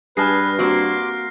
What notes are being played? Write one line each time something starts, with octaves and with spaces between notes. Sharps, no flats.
G2 G#4 B4 A5 F6 A#6 C7
A#3 C4 F#4 C6 D6